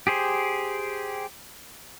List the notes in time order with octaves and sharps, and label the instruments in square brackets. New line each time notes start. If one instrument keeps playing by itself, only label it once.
[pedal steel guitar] G4 G#4 C5